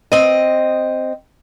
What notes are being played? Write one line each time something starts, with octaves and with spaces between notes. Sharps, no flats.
C4 D#5